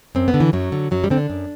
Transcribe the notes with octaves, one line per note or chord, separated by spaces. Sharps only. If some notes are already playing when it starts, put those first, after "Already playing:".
F#2 C4
B3
D3
E3
F#2 F#3
D3
F#2 F#3
G3
D3 C4
D4
F#2